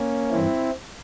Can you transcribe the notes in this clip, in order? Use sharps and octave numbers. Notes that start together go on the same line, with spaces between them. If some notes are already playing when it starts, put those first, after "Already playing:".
Already playing: A#3 C#4
G2 E3 C4 E4